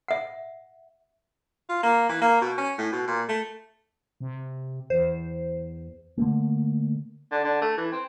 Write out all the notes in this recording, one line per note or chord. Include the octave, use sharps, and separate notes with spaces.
E5 F#5
F4
A#3
E3
A#3
B2
C#4
A2
B2
A#2
A3
C3
E2 C5
D3 A3 A#3
D3
D3
A3
E3
C4